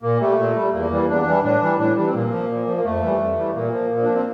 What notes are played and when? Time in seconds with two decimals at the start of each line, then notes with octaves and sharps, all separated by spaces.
0.03 A#2 A#3
0.20 G3 A3
0.39 A#2
0.56 G3
0.73 E2 A#3
0.92 E3 G3
1.08 E2 D4
1.26 E3 G3
1.43 A2 D4
1.62 E3 G3
1.79 A2 D4
1.96 E3 G3 D4
2.07 C4
2.15 A#2 A#3
2.31 F3
2.49 A#2
2.66 F3
2.77 A#3
2.84 F2 A3
3.02 E3 G3
3.20 F2
3.37 E3 G3
3.55 A#2 A#3
3.73 F3
3.91 A#2
4.03 F3 D4
4.14 C4